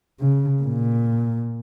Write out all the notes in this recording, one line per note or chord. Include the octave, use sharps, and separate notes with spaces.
C#3
A#2